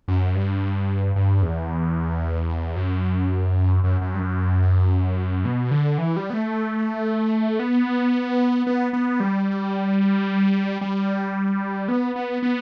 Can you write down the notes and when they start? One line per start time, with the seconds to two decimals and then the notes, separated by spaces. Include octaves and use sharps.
0.08 F#2
0.35 G2
1.16 G2
1.42 E2
2.76 F#2
3.84 F#2
4.01 F#2
4.14 G2
4.19 F#2
5.45 B2
5.71 D3
5.98 E3
6.17 G3
6.30 B3
6.34 A3
7.59 B3
8.67 B3
8.93 B3
9.20 G3
10.81 G3
11.88 B3
12.16 B3
12.42 B3